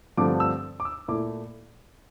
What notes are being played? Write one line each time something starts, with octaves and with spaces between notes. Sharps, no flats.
G2 D3 F3 A3 C4 D6
E6
D6
E6
A#2 A3 E4 D6